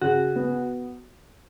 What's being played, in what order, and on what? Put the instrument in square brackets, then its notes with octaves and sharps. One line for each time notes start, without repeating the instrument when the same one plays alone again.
[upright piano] C#3 [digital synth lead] F#4
[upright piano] B3